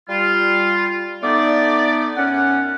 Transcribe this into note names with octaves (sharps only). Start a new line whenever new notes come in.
G3 F4
D3 A3 B3 D#4 D5
F#2 C#4 F#5